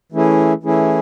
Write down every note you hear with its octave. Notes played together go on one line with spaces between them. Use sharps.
E3 A3 C#4 E4 G#4
E3 A3 C#4 E4 G#4